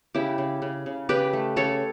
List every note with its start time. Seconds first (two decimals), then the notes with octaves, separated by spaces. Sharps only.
0.14 C#3 E4 G4
0.38 C#3
0.62 C#3
0.86 C#3
1.09 C#3 G4 B4
1.33 A3
1.56 C#3 A4 C#5